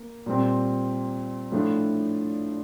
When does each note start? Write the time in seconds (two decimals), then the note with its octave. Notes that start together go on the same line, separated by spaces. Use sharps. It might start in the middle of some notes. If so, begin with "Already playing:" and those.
Already playing: A#3
0.26 A#2 G3 C4
1.52 A2 F3 A3 D4 F4